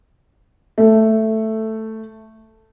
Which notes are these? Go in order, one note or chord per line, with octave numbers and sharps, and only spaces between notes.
A3 A4